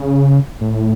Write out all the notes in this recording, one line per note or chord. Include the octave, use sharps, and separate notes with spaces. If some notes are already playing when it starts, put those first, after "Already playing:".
Already playing: C#3
A2